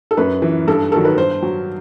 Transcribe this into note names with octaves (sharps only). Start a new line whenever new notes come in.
A4
F#2 B4
E3
G2 A4
D#3 F#3 A4
B4
G2 C5
F#3